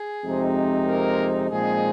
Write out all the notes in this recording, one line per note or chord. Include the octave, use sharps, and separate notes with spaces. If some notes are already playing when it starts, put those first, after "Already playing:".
Already playing: G#4
F2 C3 G#3 C4 D#4
A#3 A#4
A#2 F3 G#3 C4 D#4 G#4